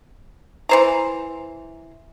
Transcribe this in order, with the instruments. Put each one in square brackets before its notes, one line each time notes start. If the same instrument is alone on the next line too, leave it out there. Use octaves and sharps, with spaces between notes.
[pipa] E3 C5 A#5